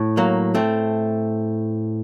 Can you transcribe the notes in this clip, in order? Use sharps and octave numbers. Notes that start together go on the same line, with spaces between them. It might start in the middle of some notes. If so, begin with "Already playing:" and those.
Already playing: A2
F#3 A#3
A3 C4